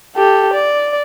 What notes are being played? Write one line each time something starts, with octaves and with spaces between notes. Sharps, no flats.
G4 A4
D5